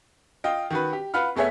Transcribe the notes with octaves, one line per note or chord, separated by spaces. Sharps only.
F4 D#5 G5
D#3 F#4 B4
G4
F4 B4 F#5 B5 F6
F1 A3 B3 G#4 C#5 E5